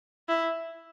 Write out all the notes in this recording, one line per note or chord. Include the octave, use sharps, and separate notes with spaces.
E4